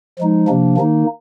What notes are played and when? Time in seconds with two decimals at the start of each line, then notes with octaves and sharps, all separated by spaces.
0.19 F3 G#3 D#4
0.48 C3 F3 A#3 D4
0.78 D#3 A#3 D#4